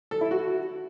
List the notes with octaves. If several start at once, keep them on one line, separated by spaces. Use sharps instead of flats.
A4
E4
F#4